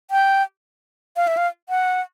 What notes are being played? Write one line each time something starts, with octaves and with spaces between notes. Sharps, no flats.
G5
F5
E5
F5
F#5